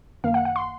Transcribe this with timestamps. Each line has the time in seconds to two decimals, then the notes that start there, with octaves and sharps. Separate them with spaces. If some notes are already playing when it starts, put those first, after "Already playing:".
0.24 F#2 D#3 A#3 F5
0.34 F#5
0.45 F#5
0.56 C6